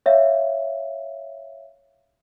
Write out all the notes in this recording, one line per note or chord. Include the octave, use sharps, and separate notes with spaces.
C#5 E5 F5